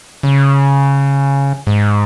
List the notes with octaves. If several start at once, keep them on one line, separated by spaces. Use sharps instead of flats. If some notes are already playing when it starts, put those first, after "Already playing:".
C#3
G#2